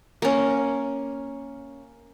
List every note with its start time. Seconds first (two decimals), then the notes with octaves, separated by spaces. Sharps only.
0.22 A#3 C#4